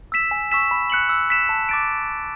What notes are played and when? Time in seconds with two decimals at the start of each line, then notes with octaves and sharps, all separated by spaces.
0.12 E6 B6 E7
0.31 G#5
0.51 C#6 E6 B6 E7
0.71 B5
0.90 F#6 C#7 F#7
1.09 E6
1.30 B6 E7
1.49 A5
1.69 D6 A6 D7